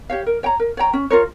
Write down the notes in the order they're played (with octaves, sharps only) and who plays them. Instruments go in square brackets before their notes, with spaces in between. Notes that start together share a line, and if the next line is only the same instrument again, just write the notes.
[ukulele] G4 C#5 F5
A#4
C#5 G5 A#5
A#4
C#5 G5 A#5
C#4
F4 A#4 C#5